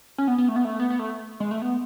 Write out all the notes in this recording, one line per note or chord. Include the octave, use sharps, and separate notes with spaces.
C#4
B3
B3
A3
B3
A3
B3
B3
A3
G#3
A3
B3